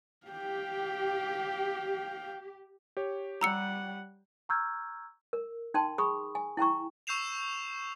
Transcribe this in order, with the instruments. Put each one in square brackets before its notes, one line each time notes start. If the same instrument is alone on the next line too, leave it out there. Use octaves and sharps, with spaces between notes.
[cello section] G4 [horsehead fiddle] F5 G5
[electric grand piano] G4 C#5
[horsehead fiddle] G3 F#5 [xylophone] A#5 E6 C#7
[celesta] A#5 C#6 E6 F6 G6 G#6
[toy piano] A#4
D#4 G5 A5 C6
G#4 B5 C#6 D#6
G#5
E4 G5 A#5 C#6
[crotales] C#6 E6 G6 C7 E7 F7